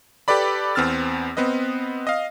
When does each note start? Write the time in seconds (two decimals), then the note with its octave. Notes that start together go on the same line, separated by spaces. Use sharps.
0.28 G4 A4 B4 D5 B5
0.75 E2 B3 C4 E6 F6 A6
1.37 B3 C4 B4 D#5
2.07 D#5 F5